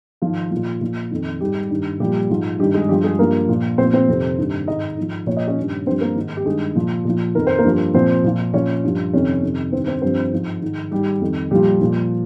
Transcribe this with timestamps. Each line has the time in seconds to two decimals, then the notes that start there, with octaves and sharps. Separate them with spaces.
0.22 G#2 D#3 F3 F4
0.52 A#2 F3
0.81 A#2 F3
1.11 F2 D#3
1.41 G#2 D#3 G3 G4
1.71 G2 D#3
2.00 A#2 F3 G3 G4
2.30 G#2 F3
2.59 G2 G3 G4
2.63 D#3
2.74 G#3 G#4
2.89 G2 F3 G3 G4
3.04 G#3 G#4
3.19 G2 F3 A#3 A#4
3.49 A#2 F3
3.78 A#2 F3 C4 C5
3.93 C4 C5
4.08 F2 C3 D#3
4.38 G2 D#3
4.67 G#2 D#3 D#4 D#5
4.97 G#2 F3
5.27 A#2 F3 C#5
5.37 D#5
5.47 C#4 C#5
5.57 G2 D#3
5.86 G2 C4 C5
5.90 F3
6.01 A#3 A#4
6.16 G#2 D#3
6.37 G4
6.45 G2 D#3 G#3 G#4
6.75 A#2 F3
7.05 A#2 F3
7.35 F2 D#3 A#4
7.47 C5
7.58 A#3 A#4
7.65 G2 F3
7.94 A#2 F3 C4 C5
8.24 A#2 F3
8.54 A#2 F3 C#4 C#5
8.84 G2 F3
9.13 F2 C3 D#3 C#4 C#5
9.43 F2 C3 D#3
9.72 G2 D#3 C4 C5
9.87 C4 C5
10.02 G2 F3 C4 C5
10.32 G#2 F3
10.62 G#2 D#3
10.91 G#2 D#3 G3 G4
11.21 F2 D#3
11.51 A#2 F3 G3 G4
11.81 A#2 F3